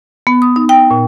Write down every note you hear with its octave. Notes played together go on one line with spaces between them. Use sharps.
B3
D#6
D#4
G5
A#2